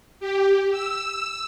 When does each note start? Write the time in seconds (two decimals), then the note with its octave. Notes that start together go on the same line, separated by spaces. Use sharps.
0.20 G4
0.71 E6